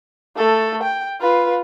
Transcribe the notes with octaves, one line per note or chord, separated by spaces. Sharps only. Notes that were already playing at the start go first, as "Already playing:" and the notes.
A3 A4
G5
F4 B4